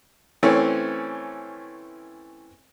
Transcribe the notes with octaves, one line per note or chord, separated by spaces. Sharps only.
E3 A3 C4 C#4